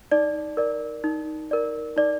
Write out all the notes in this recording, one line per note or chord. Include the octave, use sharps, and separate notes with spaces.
D#4 D5
A#4 D5
D#4
A#4 D5
D#4 D5